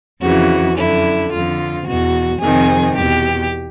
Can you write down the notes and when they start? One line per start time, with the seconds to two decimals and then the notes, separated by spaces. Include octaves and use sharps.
0.21 F2 C#3 E3 F#4
0.77 F#2 D3 E4
1.31 F2 D3 F4
1.87 E2 B2 F#4
2.42 F2 C3 D#3 G#4
2.96 E2 B2 G4